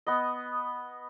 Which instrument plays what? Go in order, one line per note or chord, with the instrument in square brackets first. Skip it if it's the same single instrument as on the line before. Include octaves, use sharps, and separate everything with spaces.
[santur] B3 D#5